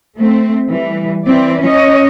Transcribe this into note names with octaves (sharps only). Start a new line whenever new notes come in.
A3 C4
E3 G3
E3 C4 D5
C#4 C#5 D#5